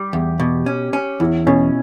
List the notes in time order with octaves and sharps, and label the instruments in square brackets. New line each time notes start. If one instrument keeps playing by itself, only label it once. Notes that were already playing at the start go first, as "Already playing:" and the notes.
Already playing: [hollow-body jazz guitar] G3 [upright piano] G4
[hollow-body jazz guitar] E2
B2
C#4
C#4
[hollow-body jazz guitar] E2 [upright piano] E4
[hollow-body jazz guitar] B2 [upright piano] C#4